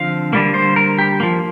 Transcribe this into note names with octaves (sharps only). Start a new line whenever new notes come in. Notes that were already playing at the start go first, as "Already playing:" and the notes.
Already playing: D3 F3 C4 F5
D3 G3 A#3
C5
A#4
G4
F3 A#3